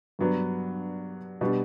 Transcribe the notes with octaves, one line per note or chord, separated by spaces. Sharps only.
G2 F#3 B3 D4
B2 G3 D4